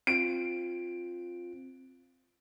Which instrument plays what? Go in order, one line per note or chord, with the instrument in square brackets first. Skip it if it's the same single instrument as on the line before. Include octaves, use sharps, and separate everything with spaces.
[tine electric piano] C4 F4 [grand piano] D7